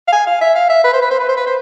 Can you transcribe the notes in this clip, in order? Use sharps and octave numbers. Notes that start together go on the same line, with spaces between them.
F5
G#5
F5
E5
F5
E5
B4
C5
B4
C5
B4
C5
B4
C5